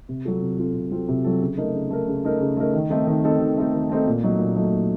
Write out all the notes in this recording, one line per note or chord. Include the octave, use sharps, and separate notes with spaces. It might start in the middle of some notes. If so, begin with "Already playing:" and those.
C3
F#3 C4 F4 A4
C3
F#3 C4 F4 A4
C3
F#3 C4 F4 A4
C3
F#3 C4 F4 A4
C#3
A3 D#4 A#4
C#3
A3 D#4 A#4
C#3
A3 D#4 A#4
C#3
A3 D#4 A#4
D#3
A3 C4 D#4 A4
D#3
A3 C4 D#4 A4
D#3
A3 C4 D#4 A4
D#3
A3 C4 D#4 A4
A#2
F#3 A3 D#4
A#2
F#3 A3 D#4
A#2